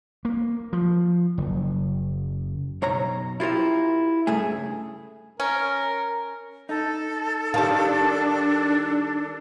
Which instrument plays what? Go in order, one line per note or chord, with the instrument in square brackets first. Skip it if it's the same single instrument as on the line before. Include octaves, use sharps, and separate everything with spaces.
[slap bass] A#3
F3
F#1
[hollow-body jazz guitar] B1 C#5 A#5
E4 F4 G4 A#4 E5
C#2 G2 A3 G#4
[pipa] C#4 [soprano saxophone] A#4
[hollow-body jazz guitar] D#4 [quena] A4
[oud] D#3 G3 [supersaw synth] D4 [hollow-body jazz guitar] F5 A5